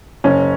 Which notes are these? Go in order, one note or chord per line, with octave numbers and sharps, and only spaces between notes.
F#1 C#4